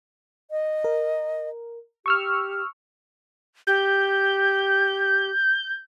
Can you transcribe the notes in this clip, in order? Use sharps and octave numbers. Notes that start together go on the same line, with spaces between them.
D#5
A#4
G4 C#6 E6 F6
G4 G6